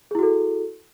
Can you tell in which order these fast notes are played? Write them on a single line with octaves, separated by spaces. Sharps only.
G#4 E4 F#4 A4